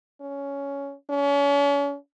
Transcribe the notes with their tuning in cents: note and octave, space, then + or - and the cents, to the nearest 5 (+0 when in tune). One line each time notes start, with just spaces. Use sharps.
C#4 +10
C#4 +35